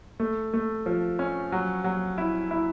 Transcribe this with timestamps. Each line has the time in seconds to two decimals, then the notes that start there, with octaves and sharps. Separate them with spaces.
0.20 A3
0.54 A3
0.86 F3
1.19 C#4
1.52 F#3
1.84 F#3
2.18 E4
2.51 E4